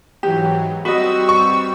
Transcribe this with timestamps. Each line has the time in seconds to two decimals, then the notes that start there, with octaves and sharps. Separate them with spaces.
0.23 G#2 E3 F#3 G4
0.85 G3 C4 F#4 B4 D#5 E6
1.29 C#6